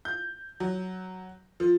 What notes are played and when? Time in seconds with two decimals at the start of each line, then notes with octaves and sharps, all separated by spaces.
0.05 G6
0.60 F#3
1.60 F3